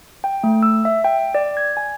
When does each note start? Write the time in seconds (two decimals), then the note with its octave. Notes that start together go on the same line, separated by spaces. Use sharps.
0.24 G5
0.44 A3
0.63 E6
0.85 E5
1.04 G5
1.35 D5
1.57 G#6
1.77 G#5